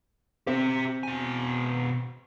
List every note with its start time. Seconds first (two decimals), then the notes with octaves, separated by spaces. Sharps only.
0.47 C4 G4 E5
1.03 B2 G#5